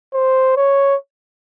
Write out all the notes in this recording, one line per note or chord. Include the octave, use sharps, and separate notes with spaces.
C5
C#5